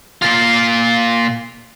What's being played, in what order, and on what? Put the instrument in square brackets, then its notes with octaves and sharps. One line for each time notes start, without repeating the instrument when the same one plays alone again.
[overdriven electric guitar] A#2 F4